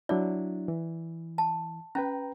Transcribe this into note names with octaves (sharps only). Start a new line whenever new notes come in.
F#3 D4 E4 D5
E3
A5
C#4 B4 G5 A#5